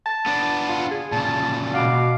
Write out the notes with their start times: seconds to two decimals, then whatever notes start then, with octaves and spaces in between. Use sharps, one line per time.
0.06 A5
0.26 B3 D4
0.69 F4
0.91 G#4
1.12 A#2 C#3 A5
1.74 B2 F#4 F5 D6